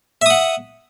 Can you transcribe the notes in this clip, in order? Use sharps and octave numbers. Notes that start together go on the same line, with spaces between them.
E5 F#5 D#6